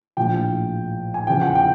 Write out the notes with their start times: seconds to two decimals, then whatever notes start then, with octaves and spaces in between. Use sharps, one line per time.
0.17 A#1 A2 F3 G5
1.14 G#5
1.27 E2 C#3 F3 G5
1.41 F#5
1.55 G5